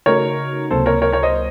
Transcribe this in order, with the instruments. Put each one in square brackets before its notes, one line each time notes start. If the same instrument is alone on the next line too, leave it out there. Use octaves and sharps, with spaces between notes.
[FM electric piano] C#3 A3 D#4 F#4 [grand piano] A#4 C#5
[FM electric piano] C#2 C3 F#3 A#3 [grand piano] A4 C5
[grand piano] A#4 C#5
A#4 C#5
A#4 C#5
C5 D#5